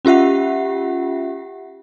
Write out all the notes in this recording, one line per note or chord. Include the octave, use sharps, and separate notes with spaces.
C#4 F4 G4 E5 F#5